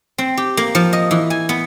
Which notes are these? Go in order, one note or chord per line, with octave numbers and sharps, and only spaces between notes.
C4
G4
A#3
F3
D#5
E3
G#5
B3